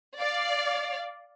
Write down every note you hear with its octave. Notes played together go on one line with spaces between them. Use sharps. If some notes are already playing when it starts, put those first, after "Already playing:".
D5 F5